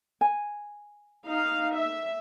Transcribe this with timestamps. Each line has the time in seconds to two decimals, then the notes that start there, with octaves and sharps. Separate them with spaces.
0.21 G#5
1.26 D#4 F5
1.76 E5